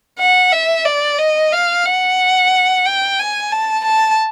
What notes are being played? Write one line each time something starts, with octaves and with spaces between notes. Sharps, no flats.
F#5
E5
D5
D#5
F5
F#5
G5
G#5
A5
A5